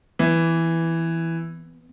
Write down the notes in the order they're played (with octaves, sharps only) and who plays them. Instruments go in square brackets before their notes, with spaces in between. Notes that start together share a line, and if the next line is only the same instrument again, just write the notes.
[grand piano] E3 [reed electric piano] B3